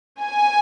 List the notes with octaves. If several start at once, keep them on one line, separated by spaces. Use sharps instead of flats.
G#5